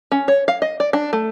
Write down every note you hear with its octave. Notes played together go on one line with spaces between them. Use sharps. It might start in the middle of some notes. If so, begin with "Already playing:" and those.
C#4
C#5
F5
D#5
D5
D4
A3